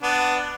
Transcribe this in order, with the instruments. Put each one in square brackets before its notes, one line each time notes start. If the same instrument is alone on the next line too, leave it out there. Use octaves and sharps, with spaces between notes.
[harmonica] B3 D4